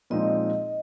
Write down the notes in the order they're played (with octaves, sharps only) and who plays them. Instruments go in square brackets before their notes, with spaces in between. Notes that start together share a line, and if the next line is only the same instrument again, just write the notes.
[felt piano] A#2 F3 G#3 C4 D#4 [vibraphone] D#5